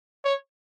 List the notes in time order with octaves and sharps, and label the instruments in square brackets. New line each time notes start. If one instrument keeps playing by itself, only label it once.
[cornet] C#5